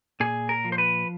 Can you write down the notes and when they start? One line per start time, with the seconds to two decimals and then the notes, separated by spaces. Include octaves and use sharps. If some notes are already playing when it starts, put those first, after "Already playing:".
0.20 A#2 G#4
0.49 A#4
0.64 F3
0.72 C5
0.78 B4